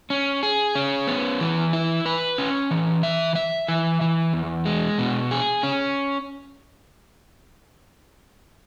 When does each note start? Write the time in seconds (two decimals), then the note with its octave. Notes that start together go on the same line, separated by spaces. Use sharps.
0.10 C#4
0.43 G#4
0.75 C#4
1.07 B3
1.40 E3
1.73 E4
2.06 B4
2.38 C#4
2.71 E3
3.03 E5
3.35 E5
3.68 E3
4.01 E3
4.34 E2
4.66 G#3
4.99 B2
5.31 G#4
5.63 C#4